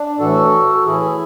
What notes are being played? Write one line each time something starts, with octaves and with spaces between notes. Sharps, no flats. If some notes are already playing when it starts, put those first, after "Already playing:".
Already playing: D4
A2 E3 F#4 A4
A4
A2 E3 E4 G#4